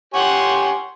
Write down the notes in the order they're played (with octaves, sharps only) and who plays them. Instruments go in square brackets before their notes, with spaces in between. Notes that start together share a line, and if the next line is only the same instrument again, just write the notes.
[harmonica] G4 C#5 G#5 [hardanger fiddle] F#5 C6